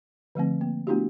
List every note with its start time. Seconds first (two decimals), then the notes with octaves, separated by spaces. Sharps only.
0.35 D3 F3 A3 C4
0.61 A#3
0.87 A3 B3 D4 E4 F#4 G4